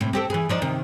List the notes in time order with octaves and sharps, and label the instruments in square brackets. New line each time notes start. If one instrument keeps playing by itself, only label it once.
[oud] A2 C3
C4 G4 A4
E3 G#4
F3 D4 D#4
C3 D#3